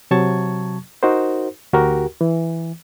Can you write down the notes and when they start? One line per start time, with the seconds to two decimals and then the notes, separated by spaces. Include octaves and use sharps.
0.11 C3 F#3 A5 C#6 G#6
1.03 D#4 F#4 A#4 C5
1.73 D2 F#4 G4 A#4
2.21 E3